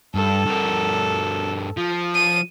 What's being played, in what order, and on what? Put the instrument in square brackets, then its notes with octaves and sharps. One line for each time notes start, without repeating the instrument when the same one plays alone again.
[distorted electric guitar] G2 [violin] A4
[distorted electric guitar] G2 A#4
F3
[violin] D#7